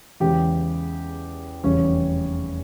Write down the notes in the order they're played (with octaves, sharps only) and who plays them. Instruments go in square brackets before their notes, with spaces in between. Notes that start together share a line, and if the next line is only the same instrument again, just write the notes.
[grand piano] E2 C#3 E3 G#3 G4
F1 E2 C#3 G3 C#4